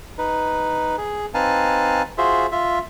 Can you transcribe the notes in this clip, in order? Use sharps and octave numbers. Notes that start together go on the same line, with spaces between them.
D#4 B4
G#4
C4 D#4 B4 F5 G#5 A5
F4 F#4 G#4 C5 E5
F4 E5